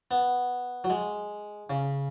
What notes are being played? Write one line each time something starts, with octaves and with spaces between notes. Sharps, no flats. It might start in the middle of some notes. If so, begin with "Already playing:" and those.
B3
F#3
G#3
C#3